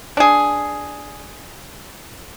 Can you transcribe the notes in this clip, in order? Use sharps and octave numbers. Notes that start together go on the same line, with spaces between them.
D4 G#4